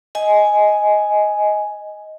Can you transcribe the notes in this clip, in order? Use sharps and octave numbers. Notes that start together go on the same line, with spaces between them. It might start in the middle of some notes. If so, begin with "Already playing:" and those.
D#5 G#5